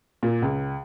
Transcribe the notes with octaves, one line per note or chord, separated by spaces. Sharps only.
A#2
C#2